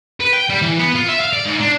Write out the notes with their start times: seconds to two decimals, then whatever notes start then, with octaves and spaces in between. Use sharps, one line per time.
0.21 B4
0.33 G5
0.50 G3
0.62 E3
0.79 B3
0.95 F4
1.08 E5
1.20 F5
1.33 D5
1.46 G#2
1.61 D4